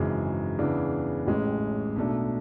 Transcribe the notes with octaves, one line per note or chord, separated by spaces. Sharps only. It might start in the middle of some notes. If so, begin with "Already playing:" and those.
Already playing: G#1 F#2 C#3 E3 G#3
E2 C#3 E3 B3 D4
A1 A2 G#3 C#4
B1 B2 A3 D4